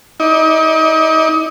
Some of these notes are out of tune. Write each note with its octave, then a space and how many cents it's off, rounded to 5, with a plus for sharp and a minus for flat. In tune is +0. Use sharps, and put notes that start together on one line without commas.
D#4 +40 D5 +20